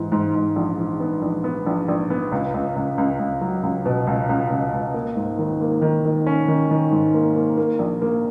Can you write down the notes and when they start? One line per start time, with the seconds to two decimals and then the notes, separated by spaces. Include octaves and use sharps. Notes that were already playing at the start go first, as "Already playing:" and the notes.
Already playing: G#2 E3
0.12 G#2
0.35 G#2
0.56 A#1
0.78 E3
1.00 B3
1.22 A#1
1.44 B3
1.66 A#1
1.88 A#1
2.10 B3
2.32 C#2
2.54 C#2
2.76 C#2
2.98 C#2
3.19 C#2
3.41 F#3
3.63 C#2
3.86 B2
4.07 C#2
4.29 C#2
4.50 C#2
4.73 C#2
4.94 A#3
5.16 G#2
5.39 D#3
5.61 A#3
5.82 D#3
6.05 D#3
6.26 C#4
6.48 D#3
6.71 D#3
6.91 G#2
7.14 A#3
7.36 A#3
7.57 A#3
7.79 A#1
8.02 A#3